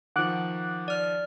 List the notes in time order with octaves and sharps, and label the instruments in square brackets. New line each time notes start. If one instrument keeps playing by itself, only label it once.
[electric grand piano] D#3 F3 [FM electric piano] F#5 D6 F#6
[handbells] D5 F6